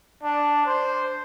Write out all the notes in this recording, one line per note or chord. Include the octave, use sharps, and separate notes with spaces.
D4
C5